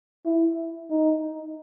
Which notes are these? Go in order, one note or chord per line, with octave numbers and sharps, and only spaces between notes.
E4
D#4